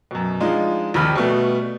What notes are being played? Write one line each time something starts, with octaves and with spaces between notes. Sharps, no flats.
F#2 B2
F3 G#3 D4 D#4 F4
A#1 D#2 C3 D#3 B5 F6
B2 G3 A3 B3 F#4